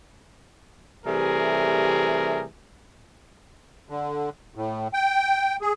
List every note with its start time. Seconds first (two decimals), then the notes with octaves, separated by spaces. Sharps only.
1.06 C3 E3 G3 A3 G#4 A#4
3.89 D3
4.55 A2
4.93 G5
5.61 G#4